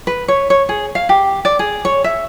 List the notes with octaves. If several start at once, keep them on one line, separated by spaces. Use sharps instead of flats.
B4
C#5
C#5
G#4
F5
G4
D5
G#4
C#5
E5